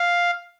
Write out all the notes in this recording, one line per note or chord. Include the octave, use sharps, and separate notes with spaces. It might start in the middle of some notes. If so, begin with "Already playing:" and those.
Already playing: F5